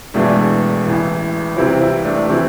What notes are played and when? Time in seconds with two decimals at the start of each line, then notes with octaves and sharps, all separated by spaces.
0.14 E1 E2 E3 A3 D4
0.85 A1 A2 E3
1.56 C2 C3 E3 C4 E4
1.81 C4 E4
2.04 A3 D4
2.28 C3 E3 C4